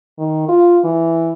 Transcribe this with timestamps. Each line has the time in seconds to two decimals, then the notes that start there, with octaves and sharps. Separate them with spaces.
0.18 D#3
0.49 F4
0.84 E3